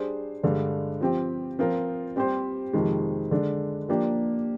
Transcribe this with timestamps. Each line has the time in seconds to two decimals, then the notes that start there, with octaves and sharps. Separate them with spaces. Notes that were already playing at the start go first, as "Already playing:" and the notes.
Already playing: G3 D4 G#4 C5
0.43 G2 D3 G#3 D4
1.01 F3 C4 G4
1.59 F3 C4 F4 A#4
2.16 G3 C4 G4 C5
2.73 F2 C3 D#3 G#3
3.31 D3 G#3 D4
3.89 F3 A#3 D4 G4